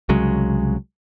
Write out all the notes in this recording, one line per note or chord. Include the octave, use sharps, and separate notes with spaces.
C2 C#3 F#3 G#3